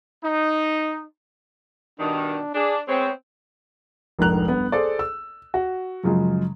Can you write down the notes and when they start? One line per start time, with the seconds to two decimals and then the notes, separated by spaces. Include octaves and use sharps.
0.23 D#4
2.00 G2 B2 D#3 D4
2.54 D4 G#4
2.88 G#3 B3 C4 C#5
4.19 F1 A#1 G#2 A#4 F#6 F7
4.48 G2 B3
4.72 G#4 A4 C5 D5
4.99 E6
5.54 F#4
6.04 F#2 C#3 F3 F#3 G#3